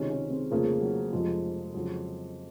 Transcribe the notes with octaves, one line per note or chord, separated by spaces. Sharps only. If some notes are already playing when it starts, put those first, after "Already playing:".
Already playing: C#2 C3 D#3 C#4
C#4
C4
F1 F2 C#3 F3 A#3
F#3
F1 F2 C3 F3 G#3
F2 C#3 F#3